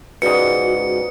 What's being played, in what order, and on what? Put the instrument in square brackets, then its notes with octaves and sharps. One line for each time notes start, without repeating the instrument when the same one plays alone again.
[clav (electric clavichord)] C#2 G#2 [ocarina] F#4 [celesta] B4 D5 D#6 [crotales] C#7